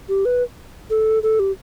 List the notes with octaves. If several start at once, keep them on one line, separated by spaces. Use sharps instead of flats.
G4
B4
A4
A4
G4